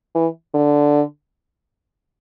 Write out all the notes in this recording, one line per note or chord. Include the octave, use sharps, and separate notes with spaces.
E3
D3